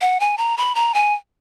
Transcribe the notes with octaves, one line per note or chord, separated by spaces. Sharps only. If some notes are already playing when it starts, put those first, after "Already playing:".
F#5
G#5
A#5
B5
A#5
G#5